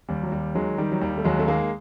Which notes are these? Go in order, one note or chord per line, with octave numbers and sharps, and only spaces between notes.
D#2 G3
F#3
D#2 G3
D#3 F#3 G#3
D#3 G3
F#3
D#2 G3
A3
D#2 F#3 G#3
A3
D#3 G#3 A#3